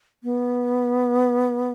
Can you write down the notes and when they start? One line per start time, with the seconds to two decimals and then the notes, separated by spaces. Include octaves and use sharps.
0.23 B3